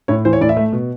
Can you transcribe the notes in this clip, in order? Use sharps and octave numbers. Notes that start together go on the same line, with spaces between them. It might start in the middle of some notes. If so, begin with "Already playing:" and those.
A2 C#5
E3 C5
C#5
A2 D5
E5
A3
B2